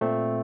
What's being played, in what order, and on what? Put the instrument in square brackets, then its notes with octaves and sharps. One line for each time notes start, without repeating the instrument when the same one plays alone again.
[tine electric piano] A#2 A3 C4